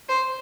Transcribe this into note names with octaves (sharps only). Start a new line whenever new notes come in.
C5